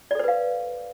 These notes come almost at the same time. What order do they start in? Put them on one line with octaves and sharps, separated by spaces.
D5 A4 C5 B4 F5